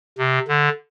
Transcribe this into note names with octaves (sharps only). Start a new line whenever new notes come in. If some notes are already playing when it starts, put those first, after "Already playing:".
C3
D3